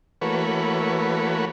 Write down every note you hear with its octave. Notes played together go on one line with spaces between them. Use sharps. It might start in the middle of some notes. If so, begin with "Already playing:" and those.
E3 A3 A#3 F#4 B4 C#5